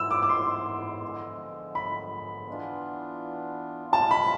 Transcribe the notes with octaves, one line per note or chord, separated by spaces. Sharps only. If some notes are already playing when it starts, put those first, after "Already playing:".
Already playing: G#2 E3 B3 E4 E6
D6
D6
C6
D3 F3 G#3 B3
B5
E3 B3 D4 F4
C3 G#3 C4 F4 A5
B5